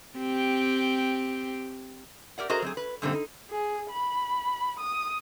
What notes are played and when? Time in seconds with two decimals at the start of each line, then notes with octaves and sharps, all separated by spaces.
0.17 C4 G4
2.38 G4 A#4 D5 F#5
2.50 F#4 G#4 A#4 C5 D#5 A#5
2.62 F#3 C4 G#4
2.77 B4
3.02 F#2 A#2 D3 G3 A#3 C4
3.13 D#4
3.51 G#4
3.89 B5
4.79 D#6